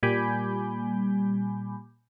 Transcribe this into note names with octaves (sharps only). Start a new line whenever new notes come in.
A#2 G3 G#5 B5 D6 G6